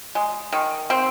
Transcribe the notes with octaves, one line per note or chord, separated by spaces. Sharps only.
G#3
D#3
C4